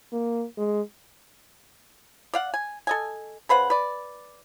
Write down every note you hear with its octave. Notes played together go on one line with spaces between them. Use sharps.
A#3
G#3
D5 F5 F#5
G#5
A4 D#5 G#5
C#3 B4 C5 F#5
B4 D5